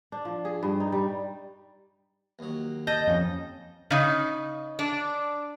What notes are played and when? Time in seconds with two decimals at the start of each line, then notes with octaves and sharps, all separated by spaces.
0.12 D4
0.25 F3
0.45 G#4
0.63 G2
0.80 D#4
0.92 G3
2.39 D#2 F#3
2.87 D#5 A5 G6 A#6
3.07 F2 C#4
3.91 C#3 D#4
4.79 D4